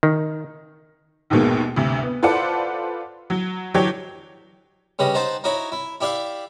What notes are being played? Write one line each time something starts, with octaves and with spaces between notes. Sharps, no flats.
D#3
A#1 D#2 G#2 B2 G#3 A#3
D2 G2 C3
B3
F4 A4 B4 C5 D5 F#5
F#3
D3 E3 F#3 D4 G4 C#5
C#3 G3 B4 D#5
D#4 C5 F#5 A5
D#4 E4 F#4 C#5
E4
E4 G4 D5 E5 F5